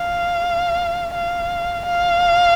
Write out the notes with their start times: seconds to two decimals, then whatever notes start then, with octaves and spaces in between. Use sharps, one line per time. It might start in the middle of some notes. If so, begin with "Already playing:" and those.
Already playing: F5
1.15 F5
1.86 F5